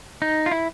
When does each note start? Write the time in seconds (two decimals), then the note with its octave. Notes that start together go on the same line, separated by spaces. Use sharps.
0.22 D#4
0.46 F4
0.51 E4